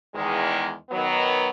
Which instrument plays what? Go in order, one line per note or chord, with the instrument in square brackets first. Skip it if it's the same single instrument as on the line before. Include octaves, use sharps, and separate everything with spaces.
[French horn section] E2 D#3 G#3
D#3 F#3 B3